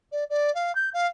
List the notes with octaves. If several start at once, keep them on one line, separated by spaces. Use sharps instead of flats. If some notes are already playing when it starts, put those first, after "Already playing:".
D5
D5
F5
G6
F5